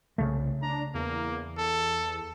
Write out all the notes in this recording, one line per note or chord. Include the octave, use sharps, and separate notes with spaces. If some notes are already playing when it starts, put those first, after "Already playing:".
C2 C#3 A3
D4 A#5
E2 A#3
A4